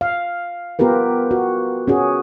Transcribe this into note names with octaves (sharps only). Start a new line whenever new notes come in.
F5
B3 F4 G4 A#4 B4
F#4
C#4 F#4 G#4